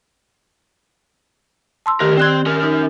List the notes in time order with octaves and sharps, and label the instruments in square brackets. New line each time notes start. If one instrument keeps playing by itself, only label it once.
[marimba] A5 C6 E6
[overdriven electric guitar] D2 A#4 [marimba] D#3 G4
[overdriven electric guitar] C4 C6 [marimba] D5 F#6 G#6
[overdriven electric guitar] C#4 A#4
[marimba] D#4